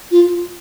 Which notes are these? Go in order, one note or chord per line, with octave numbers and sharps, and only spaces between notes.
F4